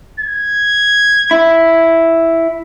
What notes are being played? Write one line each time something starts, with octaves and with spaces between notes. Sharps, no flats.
G#6
E4